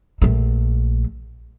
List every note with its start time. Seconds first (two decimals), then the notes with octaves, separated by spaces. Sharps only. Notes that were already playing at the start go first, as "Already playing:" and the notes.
0.22 A#1 A3